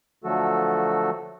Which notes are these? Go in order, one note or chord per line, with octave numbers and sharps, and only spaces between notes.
D3 F3 F#3 A3 F#4 A4